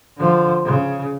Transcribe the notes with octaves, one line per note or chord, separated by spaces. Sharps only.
D3 F3
C#3